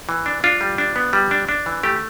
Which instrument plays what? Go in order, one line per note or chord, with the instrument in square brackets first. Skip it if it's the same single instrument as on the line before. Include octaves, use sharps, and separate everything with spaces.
[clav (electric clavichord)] E3
D4
D4 F4
G3
D4
B3
G3
D4
D4
E3
A3 G4